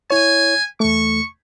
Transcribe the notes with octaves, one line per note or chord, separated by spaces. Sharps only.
E4 C#5 G#5
E2 A3 C#6